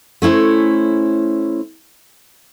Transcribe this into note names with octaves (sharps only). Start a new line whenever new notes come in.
A3 C#4 E4 C5